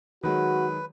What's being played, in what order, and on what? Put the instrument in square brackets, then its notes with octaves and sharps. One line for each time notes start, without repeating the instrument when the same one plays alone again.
[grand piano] D#3 F#3 G#3 [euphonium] F#4 [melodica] B4